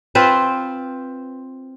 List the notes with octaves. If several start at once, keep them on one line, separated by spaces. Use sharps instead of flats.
C4 F4 B4 C5